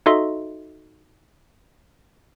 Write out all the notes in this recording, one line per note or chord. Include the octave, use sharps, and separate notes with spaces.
D#4 F#4 A4 D#5 E5 C6